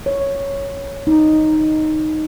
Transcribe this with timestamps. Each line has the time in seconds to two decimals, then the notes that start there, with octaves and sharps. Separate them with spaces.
0.06 C#5
1.07 D#4